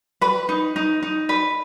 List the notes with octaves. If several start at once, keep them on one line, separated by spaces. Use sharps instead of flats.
B4 B5
D#4
D#4
D#4
B4